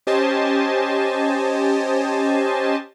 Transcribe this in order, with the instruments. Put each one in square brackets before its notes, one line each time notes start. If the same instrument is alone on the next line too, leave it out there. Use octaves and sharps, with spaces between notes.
[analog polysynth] C#4 G4 C5 D#5 G#5 A5